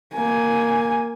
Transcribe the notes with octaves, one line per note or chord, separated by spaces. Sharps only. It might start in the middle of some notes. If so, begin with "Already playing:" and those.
A#3 G#5